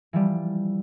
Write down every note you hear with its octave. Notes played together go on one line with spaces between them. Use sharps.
E3 F3 G3